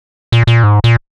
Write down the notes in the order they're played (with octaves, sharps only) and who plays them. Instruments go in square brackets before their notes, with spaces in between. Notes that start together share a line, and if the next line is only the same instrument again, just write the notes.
[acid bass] A#2
A#2
G#2
A#2